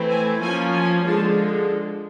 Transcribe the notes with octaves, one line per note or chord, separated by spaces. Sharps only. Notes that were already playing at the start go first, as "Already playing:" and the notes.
Already playing: E3 A3 C4 E4
G#5
F3 A#3 C#4 G#5
G#5
D3 F3 G#3 A5